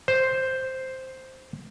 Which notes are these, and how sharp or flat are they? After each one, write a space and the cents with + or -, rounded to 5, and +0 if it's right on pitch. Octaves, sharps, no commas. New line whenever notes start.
C5 +0